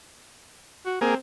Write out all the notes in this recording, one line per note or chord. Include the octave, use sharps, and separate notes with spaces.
F#4
A#3 C4 G#4